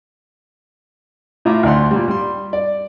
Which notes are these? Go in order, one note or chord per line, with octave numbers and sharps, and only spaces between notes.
A2 E4 F4 E5 A#5 D6
D2 D4 D5 F#5 C6
A#2 G3
G3 C6
D5